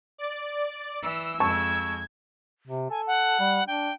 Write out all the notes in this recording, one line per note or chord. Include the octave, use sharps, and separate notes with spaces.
D5
E3 E6
F2 G#3 A5 C#6 G#6
C3
A4 G#5
F#5
G3
D4 G5